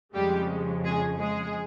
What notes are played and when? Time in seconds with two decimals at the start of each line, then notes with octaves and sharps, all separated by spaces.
0.15 F2 C#3 G3 G#3 G4
0.83 G#3 G#4
1.19 G#3 G#4